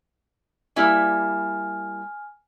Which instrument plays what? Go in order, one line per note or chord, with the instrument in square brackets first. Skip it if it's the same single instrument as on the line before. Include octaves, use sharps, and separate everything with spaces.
[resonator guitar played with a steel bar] G3 A#3 E4 [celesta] G#5 F6